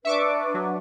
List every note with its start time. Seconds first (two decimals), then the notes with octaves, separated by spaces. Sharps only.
0.05 D4 B4 E5 C#6 D6
0.54 F#3